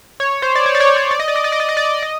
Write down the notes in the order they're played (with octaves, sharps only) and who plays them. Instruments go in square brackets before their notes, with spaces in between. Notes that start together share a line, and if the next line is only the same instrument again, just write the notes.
[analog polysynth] C#5
C5
D5
C#5
D5
C#5
C#5
D5
D#5
D5
D#5
D5
D#5
D5
D#5
D5
D#5